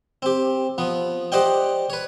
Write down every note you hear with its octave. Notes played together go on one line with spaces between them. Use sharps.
C4 G4
F3 B3
G4 C5 D5 D#5 F#5 G5
B4 C#5